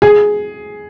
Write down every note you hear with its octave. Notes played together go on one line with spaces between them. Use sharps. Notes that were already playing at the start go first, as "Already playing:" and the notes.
G#4